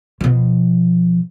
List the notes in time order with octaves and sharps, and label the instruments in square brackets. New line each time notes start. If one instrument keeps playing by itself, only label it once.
[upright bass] B2 F3